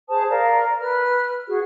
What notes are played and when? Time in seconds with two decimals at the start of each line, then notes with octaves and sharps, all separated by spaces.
0.09 G#4 C5 A5 D#6
0.30 A#4 D5 F5
0.79 B4 F6
1.48 F#4 G#4